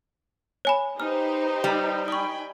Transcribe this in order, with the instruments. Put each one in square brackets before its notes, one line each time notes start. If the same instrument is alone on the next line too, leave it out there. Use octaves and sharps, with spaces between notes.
[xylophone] C#5 G#5 B5
[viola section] D#4 [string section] G4 B4 C5 [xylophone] F6
[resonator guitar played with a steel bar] G3
[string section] G5 G#5 B5 [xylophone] C#6 D#6